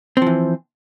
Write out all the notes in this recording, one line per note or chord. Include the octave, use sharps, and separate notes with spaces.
E3 F3 C4